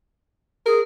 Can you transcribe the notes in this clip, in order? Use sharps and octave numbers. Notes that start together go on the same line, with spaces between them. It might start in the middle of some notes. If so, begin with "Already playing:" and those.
G#4 A#4